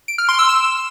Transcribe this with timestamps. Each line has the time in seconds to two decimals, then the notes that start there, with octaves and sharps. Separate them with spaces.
0.08 D7
0.18 F6
0.29 C6
0.39 E6
0.49 E7